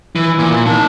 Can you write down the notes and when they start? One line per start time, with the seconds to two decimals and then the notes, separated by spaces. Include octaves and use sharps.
0.16 E3
0.39 A#2
0.66 D#4 A5